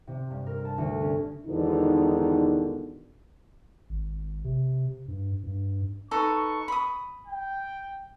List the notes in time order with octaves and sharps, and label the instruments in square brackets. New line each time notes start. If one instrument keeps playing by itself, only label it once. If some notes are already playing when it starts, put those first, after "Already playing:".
[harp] C3
G2
A#4
A5
D2
C#4
[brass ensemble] E2 G#2 B2 D3 D#3 D#4
[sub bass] G#1
C3
G2
G2
[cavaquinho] D#4 A4 B4 [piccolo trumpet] C#6
[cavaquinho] B5 D#6
[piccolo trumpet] G5